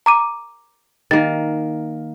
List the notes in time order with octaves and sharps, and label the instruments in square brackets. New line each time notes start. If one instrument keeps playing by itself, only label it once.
[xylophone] A#5 D6 D#7
[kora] D#3 A#3 [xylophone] A6